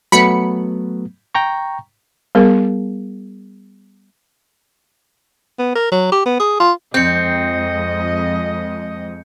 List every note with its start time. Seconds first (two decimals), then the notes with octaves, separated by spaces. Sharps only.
0.12 F#3 A3 B3 B5 C#7
1.35 G5 A#5 C#6
2.35 G3 B3 G#4 A#4
5.59 B3
5.75 A#4
5.92 F#3
6.12 G4
6.26 B3
6.40 G#4
6.60 F4
6.94 F2 G#3 C4 D#5 G6 C#7